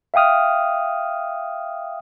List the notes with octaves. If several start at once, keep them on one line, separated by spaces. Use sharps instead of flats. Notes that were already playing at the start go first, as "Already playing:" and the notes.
E5 F5 G5 D#6 F6